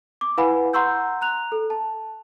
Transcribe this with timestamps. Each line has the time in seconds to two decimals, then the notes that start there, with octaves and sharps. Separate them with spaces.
0.21 D6
0.37 E4 B4 F5 F#5 G#5 B5
0.73 F#5 A#5 C6 C#6 E6 G6
1.21 A#5 F#6 F7
1.52 A4
1.70 A5